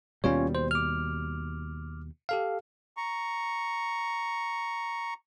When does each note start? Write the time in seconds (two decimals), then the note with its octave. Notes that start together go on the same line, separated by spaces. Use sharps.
0.24 D#2 B2 G3 C#4 F4 C#5
0.55 C5
0.71 D6 F6
2.29 G4 A4 F5
2.97 A#5 C#6